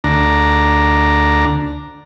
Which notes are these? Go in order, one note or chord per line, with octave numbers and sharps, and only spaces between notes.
D2 D4 A#5